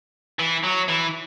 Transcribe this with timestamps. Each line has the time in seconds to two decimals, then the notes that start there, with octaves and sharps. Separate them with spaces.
0.39 E3
0.63 F#3
0.88 E3